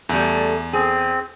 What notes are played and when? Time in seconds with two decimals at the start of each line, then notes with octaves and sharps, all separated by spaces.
0.09 E2 G3 A3
0.73 C4 G#4